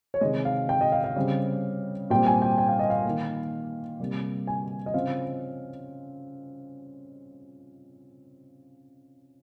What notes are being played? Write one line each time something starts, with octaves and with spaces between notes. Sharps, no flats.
C#5
C3 D#3 G#3 D#5
F5
G5
D#5
F5
F5
C#3 G3 C4
A#2 G3 C4 G5
G#5
G5
G5
F5
D#5
F5
D#3 A#3
C3 G3 A#3
G#5
D#5
C#3 F3 C4 F5